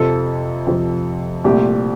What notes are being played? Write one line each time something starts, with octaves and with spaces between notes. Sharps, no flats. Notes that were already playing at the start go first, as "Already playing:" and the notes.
Already playing: F2 C3 F3 A4
F2 C3 F3
C2 A#2 A3 G4